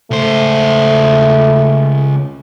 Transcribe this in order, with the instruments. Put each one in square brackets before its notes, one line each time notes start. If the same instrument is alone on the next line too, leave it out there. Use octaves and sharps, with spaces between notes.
[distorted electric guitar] C#2 C5 [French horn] A3